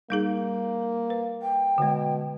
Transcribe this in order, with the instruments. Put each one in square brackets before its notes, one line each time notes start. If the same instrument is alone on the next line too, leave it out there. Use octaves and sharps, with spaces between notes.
[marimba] G3 D#4 G#4 [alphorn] A#3
[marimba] B4
[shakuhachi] G5
[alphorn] B2 [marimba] D3 G#3